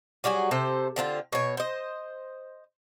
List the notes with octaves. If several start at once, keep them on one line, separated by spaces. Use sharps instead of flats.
F#3 G3 F#4 G#4
C3 A4 C5
D3 C4 D4 F4
B2 C#5
C5 D#5